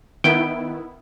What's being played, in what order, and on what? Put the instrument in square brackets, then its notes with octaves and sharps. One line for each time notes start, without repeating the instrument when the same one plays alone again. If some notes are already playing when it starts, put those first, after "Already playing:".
[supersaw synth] D#3 B3 E4 [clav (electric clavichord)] G5